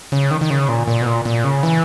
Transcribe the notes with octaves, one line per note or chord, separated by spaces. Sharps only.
C#3
D#3
D#3
C#3
A#2
A#2
B2
A#2
A#2
C#3
E3